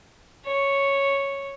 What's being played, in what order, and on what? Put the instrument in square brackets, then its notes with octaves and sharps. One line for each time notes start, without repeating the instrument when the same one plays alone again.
[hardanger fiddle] C#5